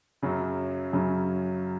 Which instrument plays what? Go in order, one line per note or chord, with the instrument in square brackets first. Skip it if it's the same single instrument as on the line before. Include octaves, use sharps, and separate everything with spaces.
[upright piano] F#2 C#3 F#3
F#2 C#3 F#3